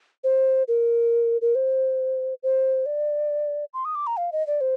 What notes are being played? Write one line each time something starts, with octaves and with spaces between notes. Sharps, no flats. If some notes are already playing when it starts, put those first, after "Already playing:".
C5
A#4
A#4
C5
C5
D5
C6
D#6
D6
A#5
F5
D#5
D5
C5